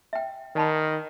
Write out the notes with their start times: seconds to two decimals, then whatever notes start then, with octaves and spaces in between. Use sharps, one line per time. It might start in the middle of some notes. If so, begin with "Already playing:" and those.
0.13 E5 G5
0.56 D#3 D5 A5 B5